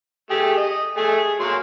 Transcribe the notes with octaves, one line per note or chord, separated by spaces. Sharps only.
A3 G4 G#4
D#5
A3 G#4
G#4
F#3 A#3 C6